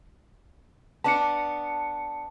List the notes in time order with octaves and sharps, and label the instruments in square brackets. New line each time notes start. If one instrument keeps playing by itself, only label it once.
[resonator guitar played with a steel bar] B3 D4 [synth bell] A5 C#7